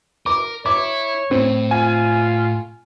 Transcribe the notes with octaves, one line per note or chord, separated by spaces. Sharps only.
A#4 D6
E4 C#5 D6
A2 C4
F4 G#5